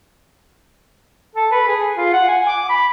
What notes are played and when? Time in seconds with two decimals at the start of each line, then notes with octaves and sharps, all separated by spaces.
1.35 A4
1.52 B4
1.68 G#4
1.97 F4
2.13 F#5
2.28 G#5
2.48 D6
2.69 B5